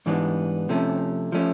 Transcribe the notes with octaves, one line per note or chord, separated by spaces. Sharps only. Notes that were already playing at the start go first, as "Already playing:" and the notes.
G#2 E3 G3 B3 D4
C3 F3 A3 C#4
F3 A3 C#4